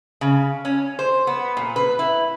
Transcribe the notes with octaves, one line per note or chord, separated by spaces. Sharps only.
C#3
C#4
C5
B3
A#2
B4
E4